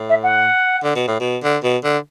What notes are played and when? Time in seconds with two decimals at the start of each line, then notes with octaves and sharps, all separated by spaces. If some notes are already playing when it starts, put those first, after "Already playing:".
Already playing: A2
0.09 E5
0.23 F#5
0.84 D3
0.96 B2
1.07 A2
1.20 B2
1.43 D3
1.64 B2
1.84 D3